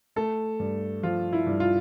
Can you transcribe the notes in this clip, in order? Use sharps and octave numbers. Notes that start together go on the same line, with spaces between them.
A3 A4
G2
F3 F4
E4
G2
F4